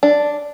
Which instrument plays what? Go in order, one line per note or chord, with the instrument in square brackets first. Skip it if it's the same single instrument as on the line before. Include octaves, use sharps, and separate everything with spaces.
[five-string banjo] D4